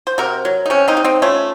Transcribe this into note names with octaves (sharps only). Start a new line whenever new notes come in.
C5
C3 F#4 A#4
F#3
D#4
C3 C#4
C4 D#4
C3
C4 D#4
A3 C#4 F4